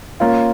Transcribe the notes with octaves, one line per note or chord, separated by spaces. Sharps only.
A#3 C#4 F4